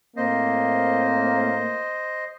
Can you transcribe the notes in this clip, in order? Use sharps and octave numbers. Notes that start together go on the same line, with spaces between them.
A2 A#3 C4 C5 D#5